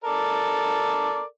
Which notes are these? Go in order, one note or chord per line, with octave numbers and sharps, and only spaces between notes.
A4 A#4 D5